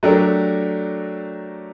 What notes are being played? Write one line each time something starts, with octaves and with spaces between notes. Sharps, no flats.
F#3 A3 D4 G4 A#4